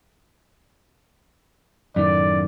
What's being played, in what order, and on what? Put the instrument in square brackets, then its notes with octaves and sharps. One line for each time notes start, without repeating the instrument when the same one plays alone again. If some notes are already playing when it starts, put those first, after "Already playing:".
[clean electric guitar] F#2 A2 D#3 [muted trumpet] D5